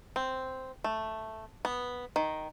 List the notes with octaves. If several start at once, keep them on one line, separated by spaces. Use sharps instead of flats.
C4
A3
B3
D#3